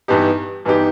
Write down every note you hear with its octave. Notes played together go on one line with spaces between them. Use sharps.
G2 E3 B3 D#4 G4
G2 E3 B3 D#4 G4